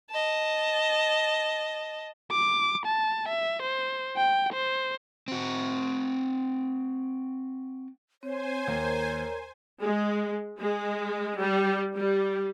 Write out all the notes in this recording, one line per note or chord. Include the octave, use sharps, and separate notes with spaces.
D#5 A5
D6
A5
E5
C5
G5
C5
C4 F#4
C4 C5 C#5 G#5
D#2 A#4 A#5
G#3
G#3
G3
G3